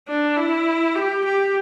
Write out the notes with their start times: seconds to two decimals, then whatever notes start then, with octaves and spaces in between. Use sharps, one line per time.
0.08 D4
0.37 E4
0.95 G4
1.24 G4